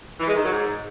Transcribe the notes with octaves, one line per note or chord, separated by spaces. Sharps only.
E3
G#3
D#3
F#3
G#2